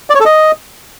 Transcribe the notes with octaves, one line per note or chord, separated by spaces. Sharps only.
D5
C#5
A4
D#5